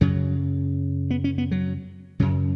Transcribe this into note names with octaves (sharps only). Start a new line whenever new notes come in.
F#2 C#3 F#3
B3
C#4
B3
F#3
F#2 C#3 F#3